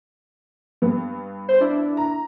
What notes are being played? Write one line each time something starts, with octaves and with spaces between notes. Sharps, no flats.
G2 B3
C5
D4 E4
A#5